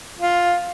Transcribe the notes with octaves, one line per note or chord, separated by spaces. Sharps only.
F4